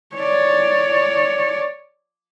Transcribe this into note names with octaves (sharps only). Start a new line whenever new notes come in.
C#5 D5